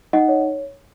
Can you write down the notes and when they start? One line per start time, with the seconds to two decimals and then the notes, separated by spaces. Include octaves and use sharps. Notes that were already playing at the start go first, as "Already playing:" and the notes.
0.13 D#4 D#5 F#5
0.28 C#5